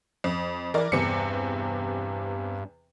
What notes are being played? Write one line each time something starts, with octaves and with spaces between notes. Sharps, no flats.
F2
E3 A#4 D5
E2 G2 C3 C#7